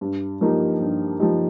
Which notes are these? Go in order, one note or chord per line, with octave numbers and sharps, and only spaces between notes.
G2
F3 A#3 D#4 G4
G2
F3 A#3 D#4 G4